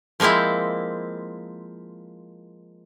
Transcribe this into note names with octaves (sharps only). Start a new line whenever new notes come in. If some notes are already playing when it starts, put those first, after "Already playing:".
F3 G#3 A#3 C4 E4